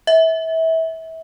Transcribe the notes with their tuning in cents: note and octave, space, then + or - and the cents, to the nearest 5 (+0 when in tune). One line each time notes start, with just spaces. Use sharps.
E5 -25